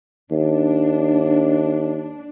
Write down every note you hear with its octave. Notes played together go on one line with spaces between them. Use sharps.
D#2 D4